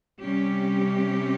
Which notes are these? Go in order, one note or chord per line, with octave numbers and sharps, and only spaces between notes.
C3 G3 C#4 G4